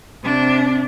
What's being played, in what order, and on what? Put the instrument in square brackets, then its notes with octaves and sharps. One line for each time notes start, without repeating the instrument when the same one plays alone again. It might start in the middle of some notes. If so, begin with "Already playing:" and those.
[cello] C3 D4